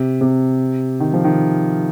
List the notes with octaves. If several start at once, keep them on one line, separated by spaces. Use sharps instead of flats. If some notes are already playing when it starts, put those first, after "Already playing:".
Already playing: C3
C3
D#3
F3
D#3